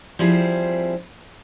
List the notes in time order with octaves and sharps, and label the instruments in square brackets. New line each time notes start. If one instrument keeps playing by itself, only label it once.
[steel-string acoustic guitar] F3 G3 C4 E4 G#4